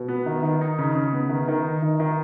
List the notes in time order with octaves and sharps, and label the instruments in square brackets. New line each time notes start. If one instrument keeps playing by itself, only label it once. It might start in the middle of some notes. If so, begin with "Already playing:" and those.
Already playing: [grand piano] B2
B3
D#3
D#3
D#4
C#3
C#3
B3
D#3
D#3
D#4
D#3
D#3